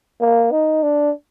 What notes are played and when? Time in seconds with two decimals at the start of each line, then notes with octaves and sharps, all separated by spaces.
0.21 A#3
0.52 D#4
0.83 D4